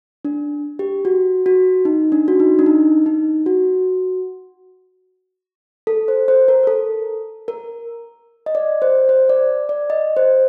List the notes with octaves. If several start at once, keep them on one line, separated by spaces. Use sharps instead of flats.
D4
G4
F#4
F#4
D#4
D4
F#4
D#4
D4
D#4
D#4
F#4
A4
C5
C5
A#4
A#4
A4
A#4
D#5
D5
C5
C5
D5
D5
D#5
C5